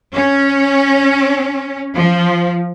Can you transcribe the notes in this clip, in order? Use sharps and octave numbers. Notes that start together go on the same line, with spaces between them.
C#4
F3